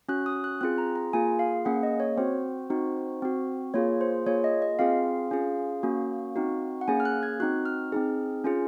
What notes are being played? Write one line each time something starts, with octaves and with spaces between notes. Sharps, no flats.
C#4 F#4 F#6
D#6
F#6
C4 F4 G#4 F#6
A#5
A#5
A#3 F4 G#4 G#5
F5
A#3 C#4 G#4 F#5
D#5
C#5
C4 F#4 C5
C4 D#4 F#4
C4 F#4
A#3 F4 G#4 C#5
C5
A#3 F4 G#4 C#5
D#5
D#5
C4 F4 G#4 F5
C#4 F4 G#4
A#3 C#4 F#4
C4 D#4 F#4
F#5
A#3 C#4 G#4 G#5
F6
F#6
G#6
C4 D#4 F#4 F#6
F6
C4 D#4 G#4
C#4 F4 G#4